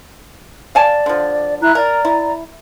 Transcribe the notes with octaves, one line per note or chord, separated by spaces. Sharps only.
D5 F5 G#5 A5
D3 F3
E4 A#5 F#6
A#4 D5 A#5
E4